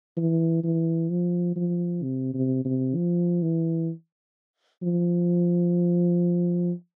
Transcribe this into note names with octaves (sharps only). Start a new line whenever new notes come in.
E3
E3
F3
F3
C3
C3
C3
F3
E3
F3